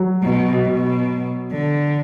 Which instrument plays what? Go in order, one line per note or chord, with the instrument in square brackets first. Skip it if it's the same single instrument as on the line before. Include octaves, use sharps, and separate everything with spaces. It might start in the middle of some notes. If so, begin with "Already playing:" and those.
Already playing: [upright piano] F#3
[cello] B2
B2
D3